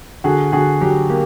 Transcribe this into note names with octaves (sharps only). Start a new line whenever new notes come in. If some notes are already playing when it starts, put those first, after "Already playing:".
D3 F#4 G#4
D3 F#4 G#4
F#3 G4
A#3 G4